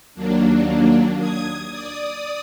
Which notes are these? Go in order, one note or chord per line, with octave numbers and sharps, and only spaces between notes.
D#2 F#3 A#3 D4
D#6 G#6
D5 D#6